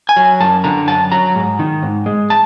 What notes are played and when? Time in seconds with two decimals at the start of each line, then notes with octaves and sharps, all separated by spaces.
0.09 G#5
0.16 F#3
0.40 F#2 A5
0.64 D3 A#5
0.88 F#2 A5
1.12 F#3 A#5
1.35 G#2
1.59 D#3
1.83 G#2
2.06 G#3
2.30 A5